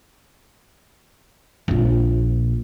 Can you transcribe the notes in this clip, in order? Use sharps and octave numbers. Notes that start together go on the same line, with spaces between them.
A#1 F4